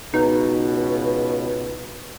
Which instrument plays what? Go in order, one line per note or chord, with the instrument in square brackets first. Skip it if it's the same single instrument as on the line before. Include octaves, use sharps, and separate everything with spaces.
[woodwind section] C#2 B2 [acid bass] D#4